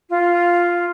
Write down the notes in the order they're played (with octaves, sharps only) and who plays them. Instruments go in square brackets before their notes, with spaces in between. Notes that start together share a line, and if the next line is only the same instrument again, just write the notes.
[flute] F4